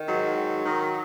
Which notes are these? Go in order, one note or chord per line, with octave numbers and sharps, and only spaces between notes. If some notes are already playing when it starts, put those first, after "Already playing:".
Already playing: D#3
G#2 F#3
D#3
D#3